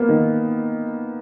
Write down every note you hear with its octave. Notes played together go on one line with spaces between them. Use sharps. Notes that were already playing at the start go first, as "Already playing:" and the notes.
Already playing: A#3 B3
D#3